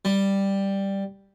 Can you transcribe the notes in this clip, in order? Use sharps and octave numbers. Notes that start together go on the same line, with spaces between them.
G3